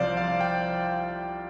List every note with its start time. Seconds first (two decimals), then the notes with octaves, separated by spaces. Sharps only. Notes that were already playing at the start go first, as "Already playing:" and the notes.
Already playing: C2 C3 F3 C5 D5 F5
0.17 F5
0.41 G5